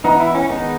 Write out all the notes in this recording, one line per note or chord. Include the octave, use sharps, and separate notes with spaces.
E3 B3 D#4
E4
C#4
D#3 G#3 B3 D#4